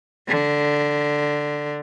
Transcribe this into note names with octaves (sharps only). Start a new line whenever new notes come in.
D3